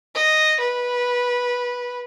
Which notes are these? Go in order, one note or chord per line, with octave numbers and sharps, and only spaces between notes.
D#5
B4